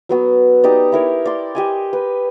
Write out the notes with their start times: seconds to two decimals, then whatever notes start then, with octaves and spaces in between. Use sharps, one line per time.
0.09 F#3 B3 F#4
0.64 D#4 G4 D5
0.92 E4 A#4 C#5
1.25 D5 C6
1.55 G4 D#5 G#5
1.93 B4